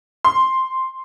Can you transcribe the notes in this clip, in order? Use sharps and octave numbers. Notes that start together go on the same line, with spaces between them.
C6